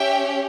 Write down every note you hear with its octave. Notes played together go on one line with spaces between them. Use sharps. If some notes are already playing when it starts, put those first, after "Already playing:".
Already playing: C#4 G4 E5 G5